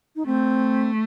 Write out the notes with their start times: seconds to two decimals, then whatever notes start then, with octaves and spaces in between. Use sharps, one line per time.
0.16 D#4
0.26 A3 C4